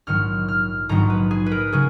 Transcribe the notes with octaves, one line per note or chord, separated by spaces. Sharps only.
A#1 G#2 D#3 F#3 F6
F6
A#1 G#2 D#3 F#3 A#5
B4
G#4
B4
A#4
C#3 F#3 G#4